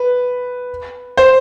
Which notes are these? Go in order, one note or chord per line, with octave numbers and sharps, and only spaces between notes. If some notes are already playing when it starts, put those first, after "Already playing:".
Already playing: B4
C5